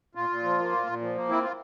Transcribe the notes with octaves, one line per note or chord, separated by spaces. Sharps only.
A#2 F4
A#2
F3
A#3
A#2
A#2
F3
A#3
C4 E4
F4